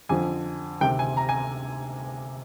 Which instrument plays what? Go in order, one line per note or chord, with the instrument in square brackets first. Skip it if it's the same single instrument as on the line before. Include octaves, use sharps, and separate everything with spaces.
[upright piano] F2 D3 F3 G#5
D2 C3 D#3 G5
G#5
A#5
G#5